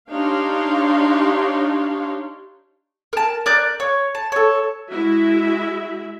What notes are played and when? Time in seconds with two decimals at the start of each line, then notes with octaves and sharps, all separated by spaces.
0.12 D4 D#4 G4 C#5 F5 C6
3.13 A#4 A5
3.46 A#4 D5 F#6 G6
3.80 C#5
4.15 A5
4.32 A4 C#5
4.87 G#3 E4 F#4 E5